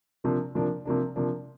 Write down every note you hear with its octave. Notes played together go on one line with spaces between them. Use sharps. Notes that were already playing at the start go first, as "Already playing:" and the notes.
C3 F3 A#3 D4
C3 F3 A#3 D4
C3 F3 A#3 D4
C3 F3 A#3 D4